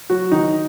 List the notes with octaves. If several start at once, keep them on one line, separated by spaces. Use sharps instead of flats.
F#3 F#4
D#3 D#4